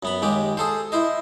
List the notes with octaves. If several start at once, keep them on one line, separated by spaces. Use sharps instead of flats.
F#2 B3 B5
D#2 G#3 G4
G#4 A4 C5
E4 C5 D#5